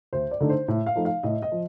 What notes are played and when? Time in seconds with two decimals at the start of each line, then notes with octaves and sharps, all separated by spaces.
0.13 D2 C5
0.31 D5
0.40 D3 A3 D#4
0.50 C5
0.68 A2
0.86 F5
0.96 F3 A3 D#4
1.05 F5
1.23 A2 D#5
1.42 D#5
1.52 F3